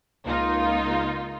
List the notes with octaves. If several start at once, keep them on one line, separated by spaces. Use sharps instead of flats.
C#2 A#3 D#4 F4